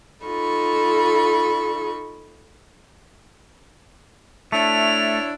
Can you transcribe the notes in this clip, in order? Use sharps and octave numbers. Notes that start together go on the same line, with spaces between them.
D#4 F4 A4 B5 C#6
A3 D4 E4 C#5 F7